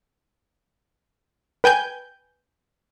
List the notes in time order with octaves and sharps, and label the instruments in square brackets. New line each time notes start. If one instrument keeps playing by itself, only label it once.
[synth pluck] B4 G5 G#5 G6 G#6